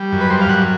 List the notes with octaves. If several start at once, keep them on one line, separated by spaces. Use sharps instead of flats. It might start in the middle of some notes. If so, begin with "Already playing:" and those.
Already playing: G3
F#2
B4
G3 C5
F5
F#2 F#5